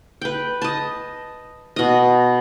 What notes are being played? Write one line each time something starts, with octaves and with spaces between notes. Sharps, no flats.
B4 G5
D#5 A5
B2 D#5